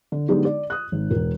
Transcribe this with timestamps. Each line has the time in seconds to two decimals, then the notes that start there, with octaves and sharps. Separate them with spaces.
0.12 D3
0.28 D3 F#3 G#3 B3 D#4 G4
0.45 D5
0.70 D#6 F#6
0.92 G#1
1.10 E1 A#4